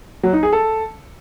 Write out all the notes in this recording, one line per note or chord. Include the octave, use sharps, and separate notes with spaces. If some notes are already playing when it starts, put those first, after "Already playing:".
F#3
D#4
G#4
A4